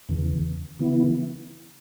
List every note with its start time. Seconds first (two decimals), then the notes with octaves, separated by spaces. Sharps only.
0.09 E2 C#3 E3
0.79 C#3 E3 B3 E4